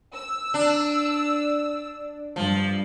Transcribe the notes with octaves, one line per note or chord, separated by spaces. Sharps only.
E6
D4
G2 F3